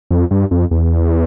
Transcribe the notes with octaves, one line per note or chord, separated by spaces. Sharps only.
F2
G2
F2
E2